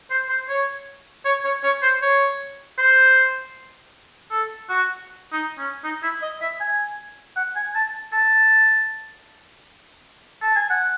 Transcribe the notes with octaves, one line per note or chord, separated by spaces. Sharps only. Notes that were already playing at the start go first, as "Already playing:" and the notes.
C5
C5
C#5
C#5
C#5
C#5
C5
C#5
C5
A4
F#4
D#4
C#4
D#4
E4
D#5
E5
G#5
F#5
G#5
A5
A5
A5
G#5
F#5